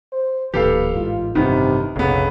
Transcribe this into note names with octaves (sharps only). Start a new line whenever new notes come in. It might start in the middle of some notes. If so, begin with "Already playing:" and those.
C5
D1 A#2 E3 G4 A4 B4 F5
A1 G#2 F4
A1 G2 C3 D#3 B3
F1 A#1 C#3 B3